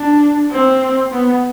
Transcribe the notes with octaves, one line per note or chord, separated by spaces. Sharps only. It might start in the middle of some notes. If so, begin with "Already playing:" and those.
Already playing: D4
C4
B3